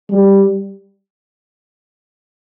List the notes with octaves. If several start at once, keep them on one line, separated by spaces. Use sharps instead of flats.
G3